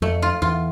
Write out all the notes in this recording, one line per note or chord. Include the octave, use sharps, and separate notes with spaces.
F2 A3
F4
E2 F4